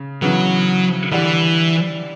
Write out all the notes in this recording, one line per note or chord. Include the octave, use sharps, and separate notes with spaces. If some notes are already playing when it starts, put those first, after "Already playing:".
Already playing: C#3
C#3 E3 F#3 B3
D3 E3 G3 D4